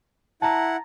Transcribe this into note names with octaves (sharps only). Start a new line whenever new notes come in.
E4 F#5 A5 A#5